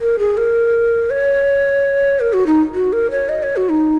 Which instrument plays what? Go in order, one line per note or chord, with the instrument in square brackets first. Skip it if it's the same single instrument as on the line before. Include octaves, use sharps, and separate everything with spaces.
[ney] A#4
G#4
A#4
C#5
A#4
F#4
D#4
F#4
A#4
C#5
D#5
C#5
F#4
D#4